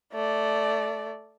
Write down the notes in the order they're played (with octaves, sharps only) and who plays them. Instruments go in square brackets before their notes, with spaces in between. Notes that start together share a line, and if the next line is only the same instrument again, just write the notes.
[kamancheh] A3 D5